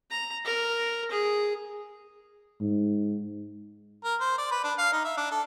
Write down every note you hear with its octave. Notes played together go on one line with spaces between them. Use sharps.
A#5
A#4
G#4
G#2
A#4
C5
D5
B4
D4
F5
D#4
E5
D4
A4